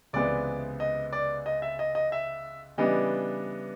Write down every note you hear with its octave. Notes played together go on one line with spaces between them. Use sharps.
C#2 C3 E3 G#3 B3 D5
D#5
D5
D#5
E5
D#5
D#5
E5
C#3 E3 G3 B3 D4 D#5